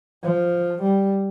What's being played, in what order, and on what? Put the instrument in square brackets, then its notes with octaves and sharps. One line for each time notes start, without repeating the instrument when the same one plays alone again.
[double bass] F3
G3